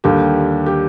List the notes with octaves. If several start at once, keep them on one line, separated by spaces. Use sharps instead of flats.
D#2 D3 G3 G4
G4